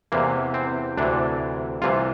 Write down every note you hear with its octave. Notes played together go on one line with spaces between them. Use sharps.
E2 C3 E3 A#3
C4
D2 C3 E3 D4
C2 C3 E3 F4